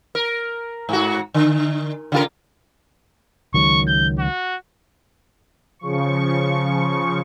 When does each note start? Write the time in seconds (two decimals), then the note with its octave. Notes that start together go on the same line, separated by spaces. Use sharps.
0.15 A#4
0.89 G#2 F#4
1.34 D3
2.12 C#3 F4 A#4
3.54 C#2 D#3 F#3 C#6
3.87 G6
4.19 F#4
5.79 C#3 F3 C#6